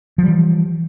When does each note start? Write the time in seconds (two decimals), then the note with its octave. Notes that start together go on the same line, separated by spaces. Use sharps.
0.18 F3
0.23 G3
0.28 E3